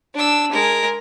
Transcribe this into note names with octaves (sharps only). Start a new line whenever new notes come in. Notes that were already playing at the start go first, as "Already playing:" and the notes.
D4 E6
G#3 A#4